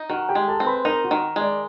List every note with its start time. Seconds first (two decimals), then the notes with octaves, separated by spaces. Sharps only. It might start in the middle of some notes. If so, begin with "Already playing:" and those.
Already playing: D#4
0.10 D#3 F#4 F#5
0.29 G4 G5
0.35 G#3
0.48 A4 A5
0.60 C4
0.66 B4 B5
0.85 D#4 A#4 A#5
1.04 F#4 F#5
1.11 D#3
1.36 G#3
1.41 D5